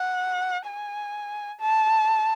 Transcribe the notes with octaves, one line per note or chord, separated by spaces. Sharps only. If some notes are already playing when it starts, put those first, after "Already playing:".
Already playing: F#5
G#5
A5